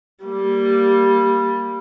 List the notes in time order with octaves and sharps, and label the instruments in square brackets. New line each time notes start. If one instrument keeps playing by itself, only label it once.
[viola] G3 A#3